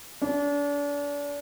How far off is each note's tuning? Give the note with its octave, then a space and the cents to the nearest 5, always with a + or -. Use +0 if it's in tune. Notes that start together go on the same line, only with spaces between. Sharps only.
D4 -35